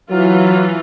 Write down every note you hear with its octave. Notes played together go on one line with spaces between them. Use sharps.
E3 F#3 F4